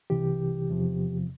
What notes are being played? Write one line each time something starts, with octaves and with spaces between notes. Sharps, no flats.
C2 C3 E3 G4
E2 C3 F3